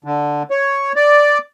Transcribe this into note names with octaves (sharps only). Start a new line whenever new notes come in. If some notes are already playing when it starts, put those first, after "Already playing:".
D3
C#5
D5